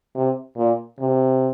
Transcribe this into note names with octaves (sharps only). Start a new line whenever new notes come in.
C3
A#2
C3